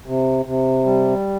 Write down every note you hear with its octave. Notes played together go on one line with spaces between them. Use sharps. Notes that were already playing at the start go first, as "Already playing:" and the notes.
C3
C3
G3